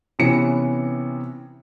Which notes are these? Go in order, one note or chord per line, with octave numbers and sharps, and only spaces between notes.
C3 E3 B3 C#4 C#7